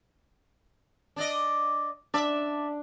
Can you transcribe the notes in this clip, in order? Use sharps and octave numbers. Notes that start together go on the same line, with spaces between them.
D4 D5 D#5
D4 D5 E5